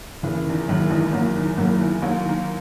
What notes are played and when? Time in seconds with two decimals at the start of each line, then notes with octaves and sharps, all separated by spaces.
0.23 F#1 C#3 E3
0.47 E2 D#3
0.68 F#1 D#3 F#3
0.90 E2 D#3 E3 G#3
1.13 F#1 F#3 A#3
1.36 E2 D#3
1.57 F#1 F#3 A#3
1.81 E2 D#3
2.02 D#2 F#3 A#3
2.25 D#3 A#3